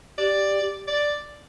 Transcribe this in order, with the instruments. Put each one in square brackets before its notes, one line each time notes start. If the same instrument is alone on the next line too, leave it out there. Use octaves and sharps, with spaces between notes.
[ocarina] G4 [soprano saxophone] D5
[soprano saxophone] D5